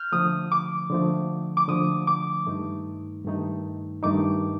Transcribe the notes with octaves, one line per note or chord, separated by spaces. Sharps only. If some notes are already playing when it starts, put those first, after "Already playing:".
Already playing: F6 G6
D3 F3 A3 D#6
D6
D3 F3 A3
D6
D3 F3 A3 D#6
D6
G2 D#3 A3 D#4
G2 D#3 A3 D#4
G2 D#3 A3 D#4 D6